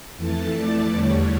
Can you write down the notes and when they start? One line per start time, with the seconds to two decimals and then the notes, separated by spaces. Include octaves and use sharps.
0.17 F2 E3 A3 A5
0.54 D5
0.91 E2 D3 G3 C#5